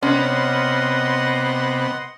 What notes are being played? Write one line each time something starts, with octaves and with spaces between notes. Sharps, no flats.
C3 B3 C#4 D#5 F#5 C6